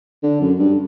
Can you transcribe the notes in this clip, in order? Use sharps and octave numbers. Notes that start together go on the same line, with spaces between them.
D3
F#2
G2